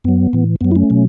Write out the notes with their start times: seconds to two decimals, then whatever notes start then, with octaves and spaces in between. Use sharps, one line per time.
0.04 F#2 F#3 B3
0.33 A2 E3
0.61 F#2 F#3 B3
0.71 E4
0.76 A3 C#4
0.90 B2 F#3